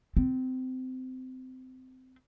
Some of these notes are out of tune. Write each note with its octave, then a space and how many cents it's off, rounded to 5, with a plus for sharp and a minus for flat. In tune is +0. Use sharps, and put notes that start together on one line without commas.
C4 -25